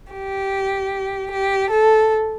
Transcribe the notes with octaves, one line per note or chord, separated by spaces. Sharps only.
G4
G4
A4